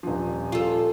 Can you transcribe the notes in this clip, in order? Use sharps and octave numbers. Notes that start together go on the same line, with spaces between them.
D#1 F3
F4 A4